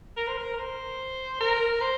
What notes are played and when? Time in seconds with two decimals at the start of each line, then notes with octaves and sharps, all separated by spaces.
0.17 A#4
0.27 C5
0.37 A#4
0.53 A#4
0.59 C5
1.40 A#4
1.81 C5